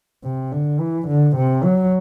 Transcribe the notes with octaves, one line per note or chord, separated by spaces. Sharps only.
C3
D3
E3
D3
C3
F#3